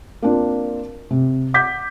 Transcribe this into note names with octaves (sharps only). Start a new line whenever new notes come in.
A#3 C4 D4 F4
C3
F#5 D6 G6 B6